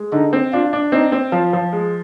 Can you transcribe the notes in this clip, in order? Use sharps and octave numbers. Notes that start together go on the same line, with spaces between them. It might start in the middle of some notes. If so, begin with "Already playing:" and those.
Already playing: G#3
D3 D#4
C4
D4 F4
D4
C4 D#4
C4
F3 F4
F3
G#3